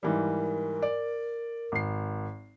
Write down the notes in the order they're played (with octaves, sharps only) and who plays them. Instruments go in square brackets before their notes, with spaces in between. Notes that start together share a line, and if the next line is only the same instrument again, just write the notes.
[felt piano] G#2 E3 G3 [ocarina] A#4
[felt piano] D5
G#1 C7